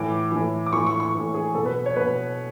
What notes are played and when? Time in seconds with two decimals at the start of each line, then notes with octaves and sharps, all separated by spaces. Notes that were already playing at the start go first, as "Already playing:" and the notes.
Already playing: A2 E3 D6
0.32 A2 E3
0.66 D6
0.73 A2 E3 C#6
0.87 C#6
1.00 C#6
1.14 A2 E3
1.34 G#4
1.55 B2 A4
1.66 B4
1.86 C#5
1.96 B2 B4